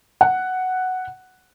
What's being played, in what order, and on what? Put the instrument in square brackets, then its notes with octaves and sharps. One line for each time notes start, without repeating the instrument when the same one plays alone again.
[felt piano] F#5